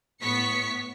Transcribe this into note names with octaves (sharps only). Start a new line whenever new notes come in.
A2 B3 C#6 B6 C#7